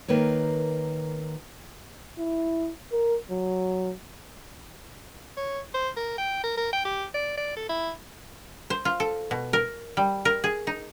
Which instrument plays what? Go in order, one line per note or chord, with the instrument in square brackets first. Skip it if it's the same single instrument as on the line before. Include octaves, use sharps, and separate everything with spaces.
[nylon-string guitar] D#3 A#3 B4 C#5
[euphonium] E4
A#4
F#3
[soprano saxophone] C#5
C5
A#4
G5
A#4
A#4
G5
G4
D5
D5
A4
E4
[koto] C5
F4
A4
B2
A#4
G3
A#4
G#4
D#4